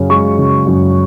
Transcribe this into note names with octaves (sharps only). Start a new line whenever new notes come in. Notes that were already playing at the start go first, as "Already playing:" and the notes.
Already playing: F#2 C#3 C#4
G#3 C#6
C#3
F#2